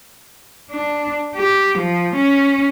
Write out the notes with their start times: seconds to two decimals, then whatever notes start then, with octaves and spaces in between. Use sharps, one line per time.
0.70 D4
1.35 G4
1.78 F3
2.15 C#4